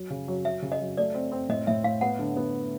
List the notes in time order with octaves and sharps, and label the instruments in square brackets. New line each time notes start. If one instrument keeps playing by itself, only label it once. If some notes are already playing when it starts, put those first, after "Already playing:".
Already playing: [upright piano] F#3
C#3
F#3
[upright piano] F#3 [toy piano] E5
[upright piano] C#3
[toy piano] D#5
[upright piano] F#3
[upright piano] A3 [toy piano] D5
[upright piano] C4
C4
[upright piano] A2 [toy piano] D#5
[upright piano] A2 [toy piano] E5
[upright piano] A2 [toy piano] F5
[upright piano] B3 [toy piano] F#5
[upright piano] D3
B3